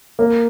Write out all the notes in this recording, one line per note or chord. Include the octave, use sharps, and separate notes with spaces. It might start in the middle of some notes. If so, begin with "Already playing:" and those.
A#3